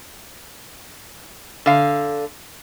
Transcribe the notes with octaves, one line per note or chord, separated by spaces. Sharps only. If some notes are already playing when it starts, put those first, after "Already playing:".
D3 F5